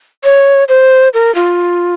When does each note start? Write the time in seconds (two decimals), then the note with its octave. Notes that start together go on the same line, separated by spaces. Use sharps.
0.24 C#5
0.69 C5
1.14 A#4
1.35 F4